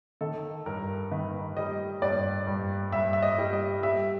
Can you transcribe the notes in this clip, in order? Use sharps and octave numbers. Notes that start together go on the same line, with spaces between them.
D#3 A4
G2 A#4
D#3 B4
G3 D#5
G2 D5
G2
G2 E5
E5
D#5
G3
D#5
G3 E5